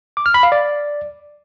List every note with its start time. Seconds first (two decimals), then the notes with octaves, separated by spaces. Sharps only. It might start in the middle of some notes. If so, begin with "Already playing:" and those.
0.17 D6
0.26 F6
0.34 B5
0.43 F5
0.52 D5